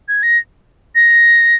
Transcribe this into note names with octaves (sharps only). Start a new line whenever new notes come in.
G#6
A#6
A#6